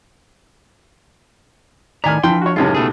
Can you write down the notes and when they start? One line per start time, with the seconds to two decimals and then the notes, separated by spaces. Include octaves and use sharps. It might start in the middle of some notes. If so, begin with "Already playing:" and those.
2.04 A2 D#3 D5 G#5 A#5 F6 B6
2.23 E3 F3 D4 G5 A5 C6
2.42 F#4 C#5
2.56 C#2 F#2 A2 G#3 C#4 D#4 F4 G4
2.74 B2 A3 G#4